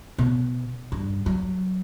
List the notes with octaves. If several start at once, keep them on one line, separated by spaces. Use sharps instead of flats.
B2
G2
F#3